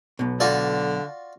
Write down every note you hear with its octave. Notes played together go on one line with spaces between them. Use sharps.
B1 B2
D3 F4 F#4 D5